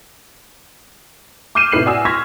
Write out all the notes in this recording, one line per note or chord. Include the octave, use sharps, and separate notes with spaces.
D6 F6 G6 C7 D#7 E7
A2 C3 D#4 B4 C7 F#7
F#4 D5 G#5 D#6 E6
C6 C#6 F6 G#6 A#6 B6